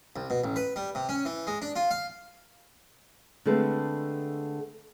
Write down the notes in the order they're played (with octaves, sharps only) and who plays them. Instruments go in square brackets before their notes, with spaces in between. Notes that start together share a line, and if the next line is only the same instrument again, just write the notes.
[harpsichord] C2
B2
A1
B4
G3
C3
C#4
E3
G#3
D4
F4
F5
[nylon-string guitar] D3 G#3 A3 C4 A4 B4